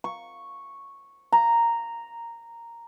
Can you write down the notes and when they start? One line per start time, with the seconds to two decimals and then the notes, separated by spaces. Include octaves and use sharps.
0.04 C#6
1.32 A#5